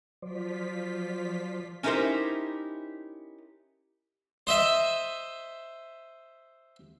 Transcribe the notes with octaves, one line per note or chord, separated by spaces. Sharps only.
F3 F#3 F4 C5 D5 B6
C#4 D#4 E4 G4 A#4 C5
C5 D#5 E5